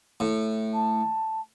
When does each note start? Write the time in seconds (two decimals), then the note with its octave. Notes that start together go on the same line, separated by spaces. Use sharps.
0.20 A2
0.73 A5